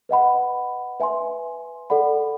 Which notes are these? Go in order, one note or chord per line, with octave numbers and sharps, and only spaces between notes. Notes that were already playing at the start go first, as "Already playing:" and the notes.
B4 D#5 F#5 B5
B4 E5 G#5 C6
A4 D5 F#5 B5